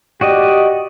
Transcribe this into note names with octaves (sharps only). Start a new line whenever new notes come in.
F#4 G4 D5 D#5